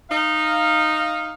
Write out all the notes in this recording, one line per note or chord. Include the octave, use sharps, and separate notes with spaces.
D#4 F5